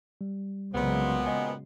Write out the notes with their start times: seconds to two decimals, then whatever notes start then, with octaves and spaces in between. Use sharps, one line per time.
0.21 G3
0.74 C2 A#2 C#3 F#3 G#3 B3 C4
1.26 D#5 G#5